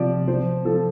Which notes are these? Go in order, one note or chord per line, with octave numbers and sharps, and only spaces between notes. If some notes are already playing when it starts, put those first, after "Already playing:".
Already playing: C3 F3 D5
F3 C5
F3 A4